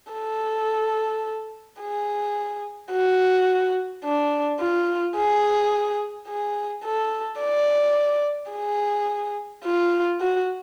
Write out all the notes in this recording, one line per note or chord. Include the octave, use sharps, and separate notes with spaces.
A4
G#4
F#4
D4
F4
G#4
G#4
A4
D5
G#4
F4
F#4